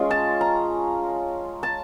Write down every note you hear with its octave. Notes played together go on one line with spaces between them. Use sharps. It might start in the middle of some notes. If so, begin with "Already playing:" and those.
Already playing: G#3 C#4 F4
A5
A#5
A5